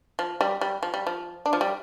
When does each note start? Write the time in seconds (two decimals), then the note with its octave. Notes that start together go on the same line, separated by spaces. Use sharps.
0.19 F3
0.41 G3
0.61 G3
0.83 F3
0.94 G3
1.07 F3
1.46 D4
1.53 F3
1.61 G3